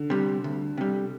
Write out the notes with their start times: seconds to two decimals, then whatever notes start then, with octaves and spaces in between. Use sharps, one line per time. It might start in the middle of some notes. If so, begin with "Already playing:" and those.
Already playing: D3
0.10 C3 G3
0.44 D2
0.77 C3 G3